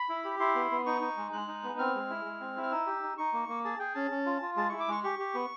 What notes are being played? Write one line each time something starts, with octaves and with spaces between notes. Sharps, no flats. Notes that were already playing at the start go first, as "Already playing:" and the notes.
Already playing: B5
E4
G4
E4 C6
B3
B3
D#4 C#6
D#4
G#3
G#3 F#6
D#4
B3
C4 F6
G#3
E4
G#3
C4
E4
F6
D#4 E6
G4
D#4
D#4 C#6
A#3
A#3
G#4 A5
G#4 G5
C#4 A5
C#4
F4
F4
G#3 A5
E4 C#6
D6
G#3 C#6
G4 C#6
G4
B3